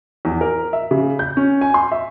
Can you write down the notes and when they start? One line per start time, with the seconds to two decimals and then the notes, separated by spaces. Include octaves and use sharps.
0.25 E2
0.41 A#4
0.73 E5
0.91 C#3
1.19 G6
1.37 C#4
1.61 G#5
1.74 C6
1.92 E5